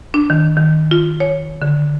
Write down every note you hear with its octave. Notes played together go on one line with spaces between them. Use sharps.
D4
D#3
D#3
F4
C#5
D3